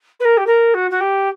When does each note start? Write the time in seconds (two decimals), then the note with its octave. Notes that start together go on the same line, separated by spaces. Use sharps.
0.20 B4
0.24 A#4
0.37 G4
0.46 A#4
0.74 F#4
0.90 F#4
1.00 G4